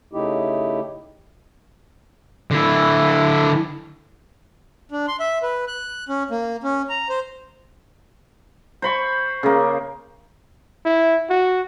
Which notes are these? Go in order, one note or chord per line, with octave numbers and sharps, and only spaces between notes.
C#3 A3 D#4 E4 G4
D3 E4
D4
C6
E5
B4
F#6
C#4
A#3
C#4
A#5
C5
C5 B5 C#6
C#3 A#3
E4
F#4